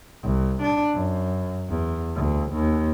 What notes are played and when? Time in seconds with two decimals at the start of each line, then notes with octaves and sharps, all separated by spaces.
0.23 C2
0.62 D4
0.94 F#2
1.69 E2
2.16 D2
2.52 D#2